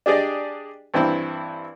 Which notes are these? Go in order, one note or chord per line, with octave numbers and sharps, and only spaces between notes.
D4 G4 G#4 D5 D#5
G2 E3 C4 E4